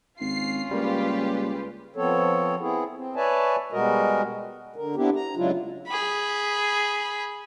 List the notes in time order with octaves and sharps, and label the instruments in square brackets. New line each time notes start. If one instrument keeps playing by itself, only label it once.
[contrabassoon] G#1 [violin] C#4 F4 [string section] C7
[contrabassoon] C#2 [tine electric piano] G3 A#3 [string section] G4 B4
[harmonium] F3 B3 C4 A4 C#5
B3 C4 E4 G#4
C4
B4 C#5 D5 E5 G#5 A5
B2 G3 G#3 F#4 A#4 D#5
D3 A#4
B3 C4 D4 E4 G4
A#5
C#3 F#3 G#3 D4 E4 F4
[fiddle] G#4 B5